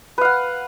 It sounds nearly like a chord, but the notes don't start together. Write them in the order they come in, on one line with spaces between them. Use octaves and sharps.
B4 F5 F#5